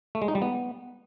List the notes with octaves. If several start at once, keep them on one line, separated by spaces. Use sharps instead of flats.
A3
G#3
D#4
G3
B3